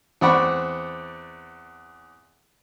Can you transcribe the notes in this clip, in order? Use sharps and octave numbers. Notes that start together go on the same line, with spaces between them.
E2 C4 D5 F#5 B5 C#6